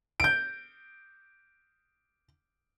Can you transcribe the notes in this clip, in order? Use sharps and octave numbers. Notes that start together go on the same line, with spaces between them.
G6 D7